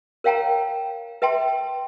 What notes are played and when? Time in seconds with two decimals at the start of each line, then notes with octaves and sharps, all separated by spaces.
0.24 A#4 C#5 F5 G5 A5 A#5
1.22 B4 E5 G5 A5 C6